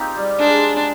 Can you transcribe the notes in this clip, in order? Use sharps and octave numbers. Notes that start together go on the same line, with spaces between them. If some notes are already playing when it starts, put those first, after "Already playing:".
Already playing: C4 D#4 F4 G4
G3
G#3 D4